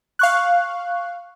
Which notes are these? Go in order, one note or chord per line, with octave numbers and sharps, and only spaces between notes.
F5 C#6 F#6